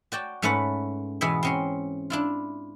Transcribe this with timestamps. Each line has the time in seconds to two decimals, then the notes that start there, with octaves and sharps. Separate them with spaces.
0.12 F#4 D5 G5 A5
0.42 G#2 A3 C#4 A4 B4 F#5
1.21 B2 E3 B3 G#4 E5
1.43 C4 C#4 C6
2.10 D4 E4 F4